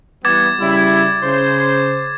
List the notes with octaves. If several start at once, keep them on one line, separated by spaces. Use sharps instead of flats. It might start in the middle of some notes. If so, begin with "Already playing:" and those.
E3 G3 B3 D6 G#6 A6
C#3 G3 E4
C#3 C5